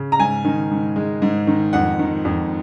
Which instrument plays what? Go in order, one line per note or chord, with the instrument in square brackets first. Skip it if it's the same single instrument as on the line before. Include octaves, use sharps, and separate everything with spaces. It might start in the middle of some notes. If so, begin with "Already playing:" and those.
Already playing: [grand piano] C#3
A#5
G#2 G#5
D#3
G#2
G#3
G#2
D#3
F2 F#5
D#3
F2